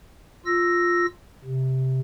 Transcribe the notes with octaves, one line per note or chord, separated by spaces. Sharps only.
F4 E6 A#6
C3